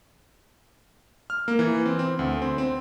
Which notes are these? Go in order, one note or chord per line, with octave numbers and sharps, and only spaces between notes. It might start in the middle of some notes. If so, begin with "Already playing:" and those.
F6
A#3
E3
C4
C4
D2
C4
C4